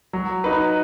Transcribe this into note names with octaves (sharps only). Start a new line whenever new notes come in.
F#3
D#4 B4